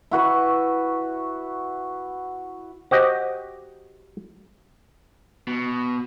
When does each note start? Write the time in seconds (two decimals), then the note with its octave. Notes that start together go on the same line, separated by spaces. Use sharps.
0.11 E4 F#4 B4 C#6
2.91 F#4 G4 C5 D#5
5.47 B2